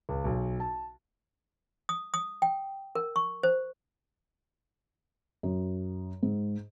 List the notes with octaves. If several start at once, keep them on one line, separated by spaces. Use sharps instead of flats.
C#2
B1
A5
D#6
D#6
G5
A#4
C#6
C5
F#2
G#2